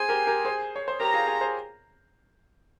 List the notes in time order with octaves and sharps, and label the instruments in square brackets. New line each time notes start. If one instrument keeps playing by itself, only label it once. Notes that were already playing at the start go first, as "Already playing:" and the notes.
Already playing: [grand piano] G#4 C5 [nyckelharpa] G#5
[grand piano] G4 A#4
G4 A#4
G#4 C5
C#5
C5
[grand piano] G4 A#4 [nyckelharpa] A#5
[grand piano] F4 G#4
F4 G#4
G#4 C5